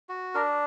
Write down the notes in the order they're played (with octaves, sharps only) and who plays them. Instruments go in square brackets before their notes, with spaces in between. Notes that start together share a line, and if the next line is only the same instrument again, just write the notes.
[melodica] F#4
D4 A#4